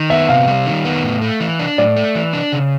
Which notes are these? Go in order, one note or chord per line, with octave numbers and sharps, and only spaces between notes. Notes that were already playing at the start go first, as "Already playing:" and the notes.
Already playing: D#3
B3 E5
C3 F5
G3
D#3
B3
A2
A3
E3
D4
A2 D5
A3
E3
D4
C#3